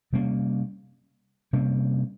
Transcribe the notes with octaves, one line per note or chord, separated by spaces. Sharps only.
C3 G3 A#3 C#4
C3 G3 A#3 C#4